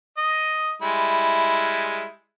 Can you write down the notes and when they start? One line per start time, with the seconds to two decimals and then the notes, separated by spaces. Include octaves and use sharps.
0.18 D#5
0.82 G3 G#3 E4